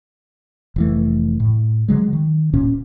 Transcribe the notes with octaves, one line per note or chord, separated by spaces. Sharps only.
F1 E3 A3
A2
D3 D#3 F#3 G#3
D#3
D1 A#2 C#4